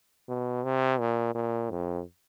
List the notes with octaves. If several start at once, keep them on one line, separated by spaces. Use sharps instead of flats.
B2
C3
A#2
A#2
F2